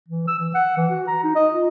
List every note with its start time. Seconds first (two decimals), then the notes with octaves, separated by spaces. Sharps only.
0.08 E3
0.27 E6
0.39 E3
0.54 F#5
0.77 E3
0.90 F#4
1.07 A#5
1.24 D#4
1.35 D#5
1.53 F4